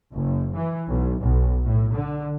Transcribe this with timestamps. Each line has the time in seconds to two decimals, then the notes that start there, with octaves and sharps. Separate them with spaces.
0.14 F#1
0.56 E3
0.88 B1
1.21 B1
1.64 A2
1.94 D3